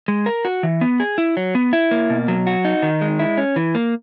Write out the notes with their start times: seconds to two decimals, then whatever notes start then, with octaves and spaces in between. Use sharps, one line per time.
0.08 G#3
0.26 A#4
0.45 F#4
0.63 E3
0.81 B3
1.00 G#4
1.18 E4
1.37 F#3
1.55 B3
1.73 E4
1.91 A#3
2.10 B2
2.28 F#3
2.47 F#4
2.65 D#4
2.83 D#3
3.01 G#3
3.19 E4
3.38 C#4
3.56 E3
3.75 A#3